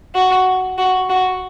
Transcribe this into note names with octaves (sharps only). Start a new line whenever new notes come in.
F#4
F#4
F#4